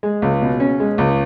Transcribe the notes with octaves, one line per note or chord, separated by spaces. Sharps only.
G#3
C#2
B2
C#4
G#3
C#2